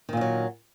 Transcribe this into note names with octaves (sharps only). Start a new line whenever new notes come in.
A#2 D3 D#3 F#3